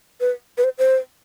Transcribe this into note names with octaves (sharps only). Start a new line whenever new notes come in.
B4
B4
C5
C5